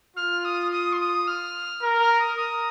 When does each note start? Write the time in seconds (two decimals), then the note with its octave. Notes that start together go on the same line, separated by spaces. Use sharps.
0.16 F4 F6
0.45 D#6
0.72 D#6
0.93 C6
1.00 D#6
1.27 F6
1.83 A#4
2.02 F6
2.20 D#6
2.37 A#4 D#6